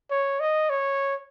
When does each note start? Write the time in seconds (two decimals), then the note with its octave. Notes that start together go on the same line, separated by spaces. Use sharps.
0.11 C#5
0.40 D#5
0.70 C#5